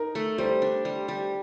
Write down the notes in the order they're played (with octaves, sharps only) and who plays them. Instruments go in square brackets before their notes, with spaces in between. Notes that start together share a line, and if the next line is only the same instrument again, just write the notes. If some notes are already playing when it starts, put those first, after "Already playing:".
Already playing: [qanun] D#4 [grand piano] A#4
[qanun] A3
[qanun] G3 [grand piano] C5
[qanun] D4
G3
G3